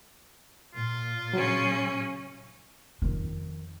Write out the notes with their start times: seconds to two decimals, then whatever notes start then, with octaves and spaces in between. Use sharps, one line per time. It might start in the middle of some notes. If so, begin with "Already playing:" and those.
0.74 A#2 F4
1.33 C#3 F#3 C#4
3.02 F2 D#3